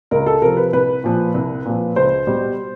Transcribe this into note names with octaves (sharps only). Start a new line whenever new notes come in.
C#2 A#4
A4
C3 F3 A#4
B4
C2 B4
A#2 F3
C2
A#2 F3
C#2 C5
B2 G3